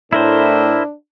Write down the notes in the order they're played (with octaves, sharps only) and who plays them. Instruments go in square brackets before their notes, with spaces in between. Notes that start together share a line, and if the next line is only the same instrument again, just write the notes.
[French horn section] A2 [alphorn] D4 [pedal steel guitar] E4 A#4 C5